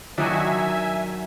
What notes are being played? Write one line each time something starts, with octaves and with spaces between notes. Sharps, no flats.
D#3 F#3 D4 D#4 F#4 E5 G#5